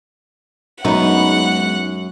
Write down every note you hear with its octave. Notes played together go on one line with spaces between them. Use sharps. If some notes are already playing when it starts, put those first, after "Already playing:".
F#2 G#3 B3 D#4 F#5